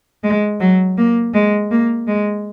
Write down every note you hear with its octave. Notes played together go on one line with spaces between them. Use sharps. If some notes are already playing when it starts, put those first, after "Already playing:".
G#3
F#3
A#3
G#3
A#3
G#3